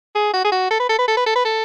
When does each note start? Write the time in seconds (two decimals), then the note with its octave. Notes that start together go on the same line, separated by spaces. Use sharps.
0.15 G#4
0.34 F#4
0.45 G#4
0.52 F#4
0.71 A4
0.80 B4
0.89 A4
0.99 B4
1.08 A4
1.17 B4
1.26 A4
1.35 B4
1.45 A4